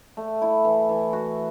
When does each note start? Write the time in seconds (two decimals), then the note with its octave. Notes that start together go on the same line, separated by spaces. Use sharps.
0.17 A3
0.42 E4
0.65 E3
0.89 E3
1.13 F#4